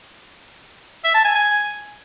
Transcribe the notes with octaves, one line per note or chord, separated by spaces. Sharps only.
E5
A5
G#5
G#5